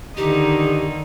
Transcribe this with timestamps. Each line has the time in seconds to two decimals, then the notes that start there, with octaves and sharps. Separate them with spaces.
0.17 D3 D#3 D#4 G4